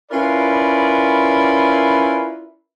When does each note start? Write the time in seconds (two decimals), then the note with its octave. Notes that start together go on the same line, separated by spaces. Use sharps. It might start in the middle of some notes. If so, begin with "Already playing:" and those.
0.11 C#4 E4 F4 A#4 B4 D5